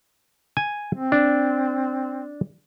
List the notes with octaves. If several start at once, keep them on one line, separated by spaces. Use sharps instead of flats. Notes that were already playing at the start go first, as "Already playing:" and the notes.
G#5
C4
D4